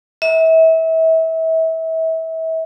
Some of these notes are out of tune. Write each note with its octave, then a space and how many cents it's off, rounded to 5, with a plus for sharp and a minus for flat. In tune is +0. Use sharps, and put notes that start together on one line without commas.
E5 -30